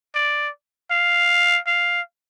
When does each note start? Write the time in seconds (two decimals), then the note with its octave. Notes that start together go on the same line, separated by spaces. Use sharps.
0.15 D5
0.91 F5
1.67 F5